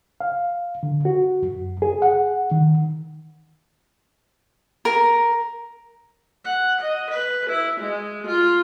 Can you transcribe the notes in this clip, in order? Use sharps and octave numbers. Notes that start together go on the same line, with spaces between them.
F5
D3
F#4
F#2
G#4
F#5
D#3
A#4
F#5
D#5
B4
E4
G#3
F4